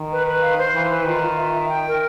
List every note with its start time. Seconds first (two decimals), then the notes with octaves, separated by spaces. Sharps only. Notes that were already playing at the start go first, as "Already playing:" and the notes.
Already playing: D#3
0.10 B4
0.26 B4
0.41 F5
0.57 C5
0.73 E3 B4
0.90 B4
1.05 D#3 F4
1.21 F4
1.37 E5
1.53 E5
1.69 G5
1.85 A#4